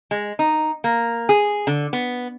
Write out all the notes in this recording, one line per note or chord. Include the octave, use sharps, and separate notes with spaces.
G#3
D#4
A#3
G#4
D3
B3